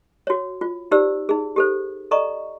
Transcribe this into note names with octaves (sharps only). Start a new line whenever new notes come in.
F#4 C#5
F4
D#4 G4 C5 D5 E6
D#4 G#4
G4 A4 C5
A4 D5 D#5 A#5 C#6